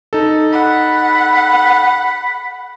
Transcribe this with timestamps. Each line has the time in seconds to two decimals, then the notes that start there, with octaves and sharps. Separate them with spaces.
0.13 D#4 A4
0.53 F#5 B5